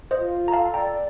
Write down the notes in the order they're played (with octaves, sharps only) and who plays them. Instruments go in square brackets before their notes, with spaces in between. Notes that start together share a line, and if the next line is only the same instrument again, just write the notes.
[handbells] C5 D#5
[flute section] F4
[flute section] A4 [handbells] A#5
[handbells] F5 A5
[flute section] D5 [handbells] G5 A#5